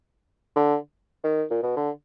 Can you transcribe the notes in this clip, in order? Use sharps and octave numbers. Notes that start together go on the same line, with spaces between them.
D3
D#3
A#2
B2
D3